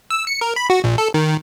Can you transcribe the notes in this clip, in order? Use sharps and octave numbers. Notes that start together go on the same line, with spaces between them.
E6
C#7
A#4
B5
F#4
A#1
A4
D#3